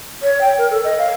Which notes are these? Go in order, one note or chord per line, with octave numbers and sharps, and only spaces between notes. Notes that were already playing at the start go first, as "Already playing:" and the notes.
C#5
G5
A#4
A4
D#5
F5